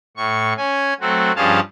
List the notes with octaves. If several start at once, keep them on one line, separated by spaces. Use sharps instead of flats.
A2 C#6
C#4 G#5
F#3 A3 C4 F#4
G2 F3 C#4 G#4 F5 A5